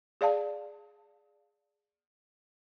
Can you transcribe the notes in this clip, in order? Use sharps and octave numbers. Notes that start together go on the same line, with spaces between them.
G#4 D5 F5 A5